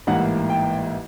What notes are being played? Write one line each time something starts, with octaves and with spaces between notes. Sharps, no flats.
A1 G#2 E3 G3 A#3 F#5
G5